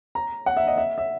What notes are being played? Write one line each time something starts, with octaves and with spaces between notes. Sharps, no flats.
A#5
F#5
E5
D#5
E5
E5